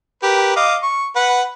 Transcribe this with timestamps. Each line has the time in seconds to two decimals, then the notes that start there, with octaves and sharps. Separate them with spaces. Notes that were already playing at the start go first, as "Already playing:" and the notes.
0.23 G4 A#4 B4
0.56 D#5 F5 D6
0.83 C#6
1.16 B4 F#5